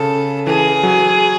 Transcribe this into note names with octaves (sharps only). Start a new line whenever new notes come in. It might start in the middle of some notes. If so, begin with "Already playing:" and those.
Already playing: C#3 A4
E3 G#4
F#3